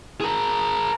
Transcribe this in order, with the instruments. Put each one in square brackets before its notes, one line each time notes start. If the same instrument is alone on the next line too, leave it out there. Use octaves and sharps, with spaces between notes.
[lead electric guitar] G#4 A#4